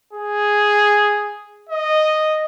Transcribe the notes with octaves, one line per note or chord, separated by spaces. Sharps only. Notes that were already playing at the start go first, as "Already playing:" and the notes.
G#4
D#5